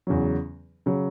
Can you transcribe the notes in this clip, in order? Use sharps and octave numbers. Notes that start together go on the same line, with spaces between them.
E2 C#3 F#3
C#3 F#3